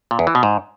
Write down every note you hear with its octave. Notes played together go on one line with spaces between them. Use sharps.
A#2
E2
E3
B2
G#2